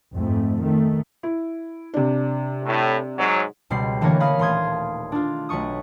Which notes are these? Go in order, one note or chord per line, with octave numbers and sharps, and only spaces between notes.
F2 G#2 A3
D#3 A3
E4
C3 D4
A2
G#2 F#3
C#2 B2 G3 C4 C7
D3 E3 A3 A#3 A#4 C#5
A#3 A#4 F5 B5 D#6 F6
D#1 A3 C6 D#6 G#6
D4 F4
B1 F#3 A3 C#6 D#6